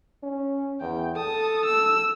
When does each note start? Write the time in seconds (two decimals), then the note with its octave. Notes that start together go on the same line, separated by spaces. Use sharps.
0.23 C#4
0.81 E2 G5
1.16 A4 A5 D#6
1.65 E6